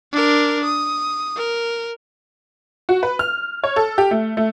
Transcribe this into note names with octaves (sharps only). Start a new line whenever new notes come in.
D4 A#4
D#6
A#4
F#4
B4
F6
C#5
A4
G4
A3
A3